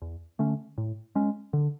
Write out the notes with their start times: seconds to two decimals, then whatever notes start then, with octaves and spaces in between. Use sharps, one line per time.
0.02 E2
0.39 D3 A3 C#4
0.78 A2
1.15 G#3 C#4
1.53 D3